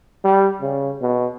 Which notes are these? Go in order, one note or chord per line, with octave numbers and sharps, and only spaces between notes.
G3
C#3
B2